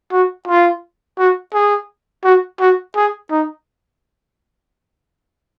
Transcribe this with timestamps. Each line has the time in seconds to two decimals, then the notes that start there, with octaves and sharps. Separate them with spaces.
0.12 F#4
0.47 F4
1.18 F#4
1.53 G#4
2.24 F#4
2.60 F#4
2.96 G#4
3.31 D#4